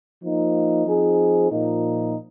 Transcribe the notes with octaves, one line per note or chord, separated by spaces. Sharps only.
F3 A#3 D#4
F3 C4 D#4 G#4
A#2 F3 A#3 D#4